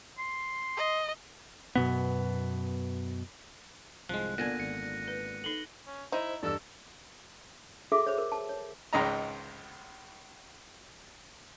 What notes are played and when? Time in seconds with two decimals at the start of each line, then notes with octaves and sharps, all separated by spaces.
0.19 C6
0.76 D#5
1.75 F#2 B2 B3
4.09 C2 G#2 F3 G#3 F#6
4.38 A#2 D3 B3 G#5 A#6 D#7
4.60 G#1 C#7
5.08 B4
5.44 D#4 A4 F#7 G7
5.87 C#4
6.12 D#4 E4 C5 D#5
6.43 E2 G2 A4 D5 E6
7.92 F#4 G#4 A4 E5 D6
8.07 C5 C#5
8.18 A#4
8.32 A5
8.49 C#5
8.93 G#1 C#2 G#2 D#4 D#5 A#5